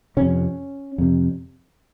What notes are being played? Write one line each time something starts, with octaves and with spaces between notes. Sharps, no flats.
F2 C3 C#4
F2 C3